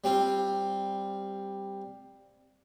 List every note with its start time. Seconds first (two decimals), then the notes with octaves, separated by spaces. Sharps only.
0.04 G3 C4 F4